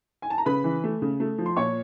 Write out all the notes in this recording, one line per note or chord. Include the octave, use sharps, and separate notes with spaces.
G#5
A5
A#5
C#3 B4 B5
E3
A3
C#3
A3
F3
C6
A#2 C#5 C#6